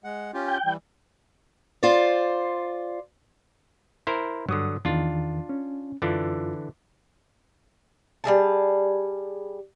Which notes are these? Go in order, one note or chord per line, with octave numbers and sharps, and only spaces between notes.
G#3 F#5
C#4 F4 G4
G5
E3 G3
F4 C5 D5
E4 A#4 C5
G2 D3 F#3 D#6
E2 D#3 D4 F4
C#4
F#2 D3 E3 D4 F4
G3 D#4 G#4 A5